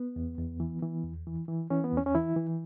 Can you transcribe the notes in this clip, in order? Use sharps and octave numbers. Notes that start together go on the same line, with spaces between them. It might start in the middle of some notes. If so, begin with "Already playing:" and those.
Already playing: B3
E2
E2
E3
E3
E2
E3
E3
E3 C#4
B3
E2 C#4
C#4
E3 E4
E3